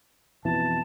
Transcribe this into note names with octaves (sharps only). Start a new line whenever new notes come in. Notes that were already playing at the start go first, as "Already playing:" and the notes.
F2 B2 E3 A5